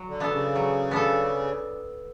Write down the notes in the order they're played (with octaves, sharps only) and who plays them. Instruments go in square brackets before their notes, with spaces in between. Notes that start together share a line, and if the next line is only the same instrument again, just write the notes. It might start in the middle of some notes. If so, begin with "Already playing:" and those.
Already playing: [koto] F#3
[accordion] D3
[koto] B3 D4 A4
[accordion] C#3
[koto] F#3
B3 D4 A4